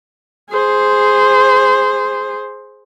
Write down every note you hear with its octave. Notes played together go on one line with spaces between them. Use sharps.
G#4 C5